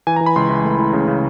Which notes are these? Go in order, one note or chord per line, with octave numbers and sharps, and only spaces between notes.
E3 G#5
A#5
E3
B5
C#2 C6
E3
A3
E3
C#3
C#3